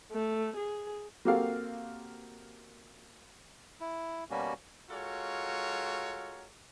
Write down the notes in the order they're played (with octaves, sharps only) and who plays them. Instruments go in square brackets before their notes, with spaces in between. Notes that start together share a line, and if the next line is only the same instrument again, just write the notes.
[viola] A3
G#4
[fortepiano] A#3 C4 F#4 G4 A4 F5
[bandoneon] E4
B2 G3 A#3 C#4 F#4
[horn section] G#3 F4 F#4 A4 A#4 C#5